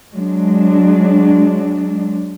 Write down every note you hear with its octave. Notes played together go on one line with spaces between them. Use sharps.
F#3 G#3 D4